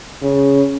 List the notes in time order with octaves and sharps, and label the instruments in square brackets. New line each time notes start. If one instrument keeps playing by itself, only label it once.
[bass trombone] C#3